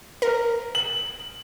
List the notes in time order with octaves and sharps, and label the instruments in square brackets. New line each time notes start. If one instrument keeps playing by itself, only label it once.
[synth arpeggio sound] A#4
[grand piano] F#7